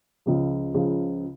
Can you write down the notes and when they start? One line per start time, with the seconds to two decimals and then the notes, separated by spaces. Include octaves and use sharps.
0.26 C#2 C#3 F3
0.74 C#2 C#3 F3